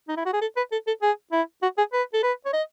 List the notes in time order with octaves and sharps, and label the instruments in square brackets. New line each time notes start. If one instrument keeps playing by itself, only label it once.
[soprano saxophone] D#4
E4
F#4
G#4
A4
B4
A4
A4
G#4
E4
F#4
G#4
B4
A4
B4
C#5
D#5